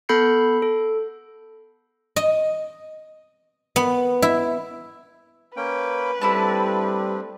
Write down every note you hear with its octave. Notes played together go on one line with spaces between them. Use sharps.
B3 A4 B5 G6 C7 C#7
A4
D#5
B3
E4
A#3 C#4 B4 G5
G3 A3 C4 D4 E4 A5